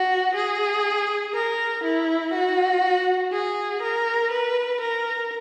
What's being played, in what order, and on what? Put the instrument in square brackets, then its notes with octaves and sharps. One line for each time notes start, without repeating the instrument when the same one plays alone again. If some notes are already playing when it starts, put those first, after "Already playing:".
Already playing: [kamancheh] F#4
G#4
A#4
E4
F#4
G#4
A#4
B4
A#4